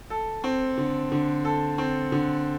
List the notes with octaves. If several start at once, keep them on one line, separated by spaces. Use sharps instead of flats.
A4
C4
D3
D3
A4
C4
D3